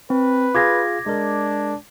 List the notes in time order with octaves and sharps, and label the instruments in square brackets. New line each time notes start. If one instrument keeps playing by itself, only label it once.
[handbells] C4 [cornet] B4
[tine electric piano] F4 G#4 F5 [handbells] D6 G#6 A#6
[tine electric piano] G#3 A#4 [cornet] D4